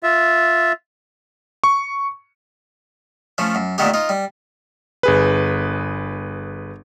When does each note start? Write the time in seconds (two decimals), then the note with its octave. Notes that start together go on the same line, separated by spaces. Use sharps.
0.03 F4 E5
1.64 C#6
3.38 F3 A3 C#4
3.55 F#2
3.78 A#2 D3 D#3 A3 B3 G4
3.94 D#4 F4
4.09 G3
5.03 G1 G#4 B4